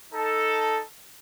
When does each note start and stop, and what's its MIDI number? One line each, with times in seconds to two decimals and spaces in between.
0.12 0.78 63
0.12 0.78 69